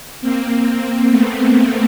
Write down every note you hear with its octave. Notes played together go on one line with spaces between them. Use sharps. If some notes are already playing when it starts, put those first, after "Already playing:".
A#3 C4
A#3 C4
A3 B3